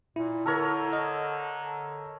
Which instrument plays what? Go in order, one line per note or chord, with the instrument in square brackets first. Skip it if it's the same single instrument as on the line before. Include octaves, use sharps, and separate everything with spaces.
[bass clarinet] A#2 [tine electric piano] E4
[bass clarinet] D3 [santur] A4 A#4 C#5
[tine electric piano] D#5